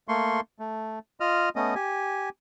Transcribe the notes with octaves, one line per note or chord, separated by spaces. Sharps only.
A3 A#3 C6 C#6
A3
F4 D#5 F6
A3 B3 C#4 D#5
G4 G#5